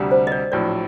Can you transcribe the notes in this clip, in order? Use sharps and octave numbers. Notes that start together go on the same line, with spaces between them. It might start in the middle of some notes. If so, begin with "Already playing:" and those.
Already playing: D2 C3 G3
C5
D#5
D5
A#1 A2 F#3 D5